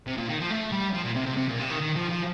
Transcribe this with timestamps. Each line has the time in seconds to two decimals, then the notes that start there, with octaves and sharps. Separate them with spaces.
0.07 C3
0.17 A#2
0.29 D#3
0.40 F3
0.50 A3
0.72 G3
0.94 F3
1.04 A#2
1.16 C3
1.27 C3
1.37 C3
1.49 A#2
1.59 C3
1.70 D#3
1.81 D#3
1.96 F3
2.10 F3